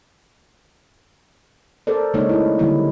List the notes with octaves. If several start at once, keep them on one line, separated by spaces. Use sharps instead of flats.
A4 A#4 C5 D5
C#3 G#3 A#3 D4 D#4 C#5
A3 D#4 E4
D3 F#3 G3 A#3 E4